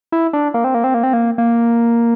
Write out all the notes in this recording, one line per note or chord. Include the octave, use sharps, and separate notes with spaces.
E4
D4
A#3
C4
A#3
C4
A#3
C4
A#3
A#3